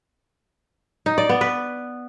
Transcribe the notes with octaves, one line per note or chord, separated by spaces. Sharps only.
D#4
D5
B3
B4